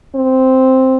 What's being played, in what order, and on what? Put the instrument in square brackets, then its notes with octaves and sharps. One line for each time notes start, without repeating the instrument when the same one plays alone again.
[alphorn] C4